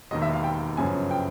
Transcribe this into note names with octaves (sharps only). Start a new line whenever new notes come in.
E1 D#2 D#3 D#5
E5
F5
G5
G1 F#2 C#3 F3 G#5
G5